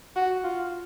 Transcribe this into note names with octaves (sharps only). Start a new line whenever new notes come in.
F#4
F4